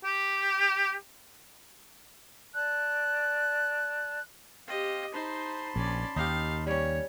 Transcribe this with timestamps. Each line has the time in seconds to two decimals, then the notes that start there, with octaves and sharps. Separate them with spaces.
0.04 G4
2.55 D5 A5 F#6
4.67 C4 G4 D#5 F5
5.13 D#4 C5 A5 B5 C6
5.76 A#1 C#4 D5
6.16 D#2 D#4 G4 F5
6.67 G3 C#4 C#5